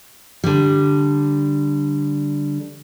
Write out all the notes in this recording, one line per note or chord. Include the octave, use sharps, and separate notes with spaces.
D3 G3